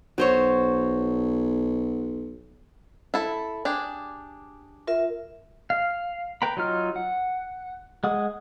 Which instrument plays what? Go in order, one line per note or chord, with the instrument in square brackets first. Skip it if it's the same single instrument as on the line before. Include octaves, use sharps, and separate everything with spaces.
[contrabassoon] B1 [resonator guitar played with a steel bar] F#3 C5 C#5
[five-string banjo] E4 A4
D4 G4 G#4
[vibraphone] F4 A#4 E5
[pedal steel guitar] F5
B4 G5 A#5 B5
F#3 D#4 F4 F6
F#5
G#3 F#5 D#6